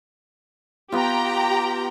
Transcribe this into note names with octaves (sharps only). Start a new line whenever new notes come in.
B3 F4 G4 G5 A#5